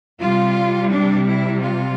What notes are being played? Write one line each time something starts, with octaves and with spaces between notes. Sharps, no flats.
C3 G3 F4
D4
E4
F4